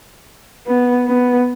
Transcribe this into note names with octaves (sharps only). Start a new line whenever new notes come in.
B3
B3